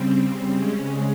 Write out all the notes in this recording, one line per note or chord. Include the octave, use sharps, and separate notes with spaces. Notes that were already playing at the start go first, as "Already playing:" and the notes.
Already playing: C#3 G3 C4
C#3 G#3 C#4